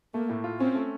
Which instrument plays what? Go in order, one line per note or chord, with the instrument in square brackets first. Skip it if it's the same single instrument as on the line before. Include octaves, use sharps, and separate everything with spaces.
[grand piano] A3 [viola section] A#3
[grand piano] A2
F4
[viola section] C4 [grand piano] C#4
[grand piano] A3